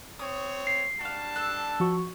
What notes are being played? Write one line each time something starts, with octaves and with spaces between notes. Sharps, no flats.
C4 C#5 D#6
C7
G3 D4 F#4 F5 A5
A4 E6 F#6
F3 F#4 C#6